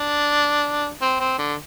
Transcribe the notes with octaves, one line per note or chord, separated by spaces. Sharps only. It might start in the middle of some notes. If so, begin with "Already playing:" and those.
Already playing: D4
C4
C4
D3